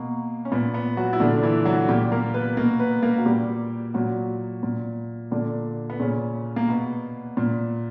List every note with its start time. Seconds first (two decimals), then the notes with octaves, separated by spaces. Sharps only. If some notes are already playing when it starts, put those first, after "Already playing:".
Already playing: B2 A#3
0.45 C#4
0.52 A#2 B3
0.74 B3
0.97 F#3 F#4
1.13 E4
1.20 A#2 D3 D4
1.43 E3 E4
1.65 F#3 F#4
1.89 A#2 G3 G4
2.12 A#3 A#4
2.34 B3 B4
2.57 B2 A#3 A#4
2.80 B3 B4
3.03 A#3 A#4
3.18 F#4
3.26 A#2 G3 G4
3.94 A#2 F#3 F#4
4.63 A#2
5.31 A#2 D3 D4
5.90 B3
6.00 A#2 C#3 C#4
6.56 A#3
6.69 B2 B3
7.37 A#2